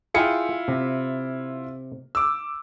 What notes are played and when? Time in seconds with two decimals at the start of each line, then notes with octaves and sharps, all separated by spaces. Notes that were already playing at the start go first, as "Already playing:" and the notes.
0.14 E4 F4 G#4 G5 C#7
0.68 C3
2.15 D6 E6